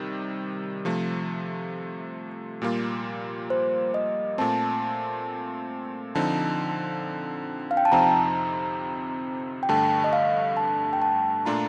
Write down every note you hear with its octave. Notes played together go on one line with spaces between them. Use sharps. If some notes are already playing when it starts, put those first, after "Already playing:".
Already playing: C3 D#3 G3
C3 F3 A3
A#2 G3 A#3 F4
C5
D#5
A#2 A3 C4 A5
D3 F3 C4 D#4 A5
F5
G5
A5
F2 C3 F3 C4 D#4 A#5
G5
G2 D3 A3 A5
D#5
F5
A5
G5
A5
A#2 A3 D4 F4 A#5